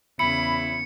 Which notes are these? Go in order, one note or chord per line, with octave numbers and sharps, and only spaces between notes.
E2 C#3 E4 B5 C#7